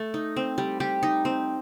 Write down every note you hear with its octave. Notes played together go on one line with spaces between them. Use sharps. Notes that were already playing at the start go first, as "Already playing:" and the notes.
Already playing: A3
D#4
C4
G3
G3 G4
D#4
C4